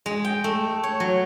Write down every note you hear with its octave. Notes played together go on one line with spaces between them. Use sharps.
G#3
G5
A3
C#5
F#3